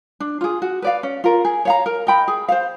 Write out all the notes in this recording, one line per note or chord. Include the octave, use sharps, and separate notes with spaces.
D4
F4 G#4
F#4
B4 D5 F5
C#4
F4 A#4
G#4
C#5 F5 A#5
A#4
D#5 G5 B5
G#4
C5 F5